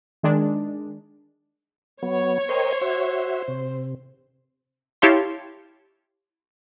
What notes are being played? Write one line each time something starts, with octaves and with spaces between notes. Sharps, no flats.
D#3 G#3 D4
F#3 B3 C#5
A#4 C5 D#5 G5
F#4 E5
C3
E4 G4 C#5 F5 A5 C6